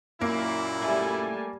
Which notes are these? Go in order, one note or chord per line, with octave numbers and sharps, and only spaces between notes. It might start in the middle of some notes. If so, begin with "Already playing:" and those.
F#2 A#2 A#3 E4
G3 A3 E5 G#5 A5